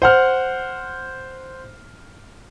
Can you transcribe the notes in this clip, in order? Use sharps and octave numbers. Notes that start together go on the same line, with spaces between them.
C5 F#5 F6